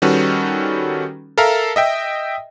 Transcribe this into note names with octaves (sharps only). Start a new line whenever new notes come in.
D#3 G3 C#4 F#4 A4 B4
A4 A#4 E5 F5 A#5
D#5 E5 G5